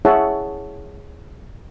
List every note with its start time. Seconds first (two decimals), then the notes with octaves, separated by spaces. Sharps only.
0.05 E4 G#4 C#5 E5 F#5 A5